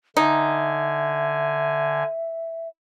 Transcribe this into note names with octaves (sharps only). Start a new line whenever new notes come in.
D3 D#4 E5 G#5